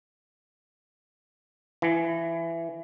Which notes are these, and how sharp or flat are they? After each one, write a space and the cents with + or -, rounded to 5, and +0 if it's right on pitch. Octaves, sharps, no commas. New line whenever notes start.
E3 +15